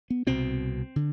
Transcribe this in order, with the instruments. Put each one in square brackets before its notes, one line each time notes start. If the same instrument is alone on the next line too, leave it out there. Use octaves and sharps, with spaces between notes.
[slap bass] B3
C2 B2 C4
D3